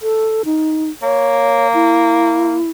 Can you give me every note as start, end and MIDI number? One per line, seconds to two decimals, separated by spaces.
0.02 0.43 69
0.45 0.90 63
1.02 2.57 58
1.02 1.68 73
1.74 2.70 64